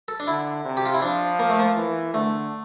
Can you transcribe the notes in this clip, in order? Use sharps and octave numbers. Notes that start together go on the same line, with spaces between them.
A4
D4
D3 E4
C3
G4
F4
E4
F3 D4
A#3
A3
A#3
E3
D3 A3